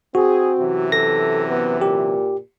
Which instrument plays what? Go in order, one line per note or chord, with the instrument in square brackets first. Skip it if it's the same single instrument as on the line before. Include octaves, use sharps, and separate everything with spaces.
[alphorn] C4 [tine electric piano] F#4 [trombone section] G#4
[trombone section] F#2 C3 E3
[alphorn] A4 [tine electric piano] A#6
[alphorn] B3
[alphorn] A#2 [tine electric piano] G4